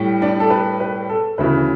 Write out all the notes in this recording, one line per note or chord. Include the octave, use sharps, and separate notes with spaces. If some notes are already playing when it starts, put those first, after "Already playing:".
Already playing: A2 G3
D4 D5
A4
B4
B4
A4
D2 C#3 E3 B4